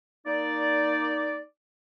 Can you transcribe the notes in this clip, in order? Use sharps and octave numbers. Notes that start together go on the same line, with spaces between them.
A#3 D#4 D5